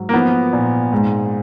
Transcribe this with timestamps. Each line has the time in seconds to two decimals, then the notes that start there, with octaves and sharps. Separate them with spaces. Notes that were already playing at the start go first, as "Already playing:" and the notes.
Already playing: G#2 F#3
0.09 A#3
0.14 F3 B3
0.53 A#2
0.92 G#2